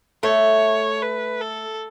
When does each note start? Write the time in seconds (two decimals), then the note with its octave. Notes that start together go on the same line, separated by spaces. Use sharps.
0.23 A3 C#5
1.02 B4
1.41 A4